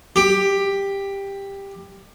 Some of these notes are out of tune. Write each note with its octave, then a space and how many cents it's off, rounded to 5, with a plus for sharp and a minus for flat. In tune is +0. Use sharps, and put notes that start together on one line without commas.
G4 +10